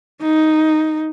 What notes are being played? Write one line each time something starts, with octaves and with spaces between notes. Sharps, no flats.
D#4